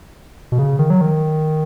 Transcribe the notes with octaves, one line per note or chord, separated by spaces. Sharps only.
B2
C#3
D#3
F#3
D#3